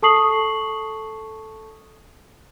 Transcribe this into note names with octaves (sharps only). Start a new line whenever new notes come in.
A4 A5 C#6 D#6 C7 F#7